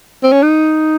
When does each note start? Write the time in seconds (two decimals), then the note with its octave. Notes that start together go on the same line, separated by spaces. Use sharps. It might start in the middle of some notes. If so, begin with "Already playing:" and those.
0.24 C4
0.32 C#4
0.43 D#4